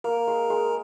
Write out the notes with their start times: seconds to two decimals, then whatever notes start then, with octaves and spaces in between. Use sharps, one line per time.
0.04 A#3 A#4 A#5
0.27 G#3
0.50 G#3